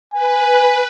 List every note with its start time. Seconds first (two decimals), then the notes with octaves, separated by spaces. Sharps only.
0.13 B4 G#5